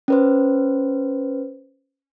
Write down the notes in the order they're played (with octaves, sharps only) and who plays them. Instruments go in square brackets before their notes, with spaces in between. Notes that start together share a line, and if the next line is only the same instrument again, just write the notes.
[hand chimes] C#4 B4 C5